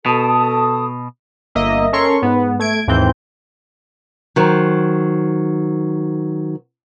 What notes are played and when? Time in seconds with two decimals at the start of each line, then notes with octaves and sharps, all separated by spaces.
0.06 B2 A4 A5 D#6
1.55 G1 A#3 D#5 E5
1.92 C#4 A4 A#4 C#5 C6 C#6
2.22 G#2 B3
2.59 A3 G#6 D7
2.87 D#2 G#2 E3 C4 G6
4.36 D#3 F#3 C5